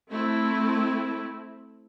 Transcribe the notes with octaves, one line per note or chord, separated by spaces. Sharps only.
A3 C4 E4